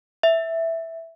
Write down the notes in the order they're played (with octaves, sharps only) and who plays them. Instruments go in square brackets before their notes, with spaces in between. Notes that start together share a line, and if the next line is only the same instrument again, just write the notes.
[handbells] E5